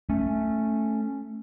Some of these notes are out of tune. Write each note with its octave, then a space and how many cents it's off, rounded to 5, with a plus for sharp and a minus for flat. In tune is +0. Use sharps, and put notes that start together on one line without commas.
A3 +0 C#4 +0